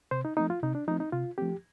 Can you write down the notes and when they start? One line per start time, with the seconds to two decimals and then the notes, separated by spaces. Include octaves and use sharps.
0.11 C3 C5
0.25 D#4
0.37 F3 A3 C4 D#4
0.50 F4
0.63 C3 D#4
0.75 D4
0.87 F3 A3 C4 D#4
1.00 D#4
1.12 C3 F4
1.38 F3 A3 C4 G4